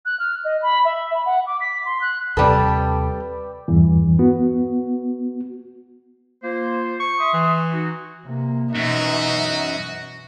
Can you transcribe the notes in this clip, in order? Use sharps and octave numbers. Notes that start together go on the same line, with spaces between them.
F#6
F6
D#5
B5
E5
B5
F#5
D6
B6
C6
F#6
D#2 C3 G3 C4 A4 B4 D5 G5
E2 G2 E3
B3 F#4
A#3 F4 C5
C#6
E5 C6 D#6
E3
D#4 F#4
C3 A#3
F#2 B2 E3 D#4 F#4 E5